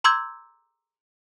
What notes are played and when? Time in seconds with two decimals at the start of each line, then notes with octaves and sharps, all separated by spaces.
0.04 A#5 C6 D6 E6 G6 G#6